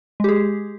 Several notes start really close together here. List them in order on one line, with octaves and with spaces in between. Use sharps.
G#3 G4 G#4